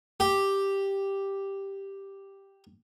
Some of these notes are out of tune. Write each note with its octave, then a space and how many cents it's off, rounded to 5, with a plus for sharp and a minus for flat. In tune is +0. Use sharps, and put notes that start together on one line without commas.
G4 +0